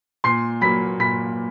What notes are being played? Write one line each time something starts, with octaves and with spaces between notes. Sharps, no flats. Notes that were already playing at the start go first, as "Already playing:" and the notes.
A#2 C6 C7
F#3 A#3 B5 B6
A#2 B5 B6